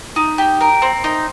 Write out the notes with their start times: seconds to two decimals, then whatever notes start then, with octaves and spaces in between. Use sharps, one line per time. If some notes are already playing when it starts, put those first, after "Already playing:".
0.16 D#4
0.38 G4
0.61 A#4
0.82 C4
1.04 D#4